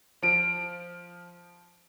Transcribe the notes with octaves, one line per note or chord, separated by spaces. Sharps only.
F3 D7